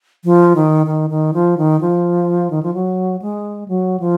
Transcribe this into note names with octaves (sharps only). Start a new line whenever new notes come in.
F3
D#3
D#3
D#3
F3
D#3
F3
D#3
F3
F#3
G#3
F#3
F3